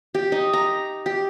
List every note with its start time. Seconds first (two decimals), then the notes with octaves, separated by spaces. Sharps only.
0.15 G4
0.32 D#4
0.53 A#5
1.06 G4